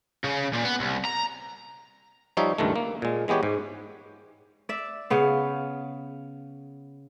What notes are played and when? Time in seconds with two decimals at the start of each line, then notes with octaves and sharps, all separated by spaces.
0.24 C#3
0.53 A#2
0.65 B3
0.80 C2
1.05 A#5
2.37 F3 G3 D#4 C#5 E5
2.58 C#2 G2 D#3 A3
2.76 A#3
3.02 A#2 G#3
3.28 E3 G#3 B3 G4 C#5
3.43 G#2
4.69 D5 E5
5.10 C#3 B3 F5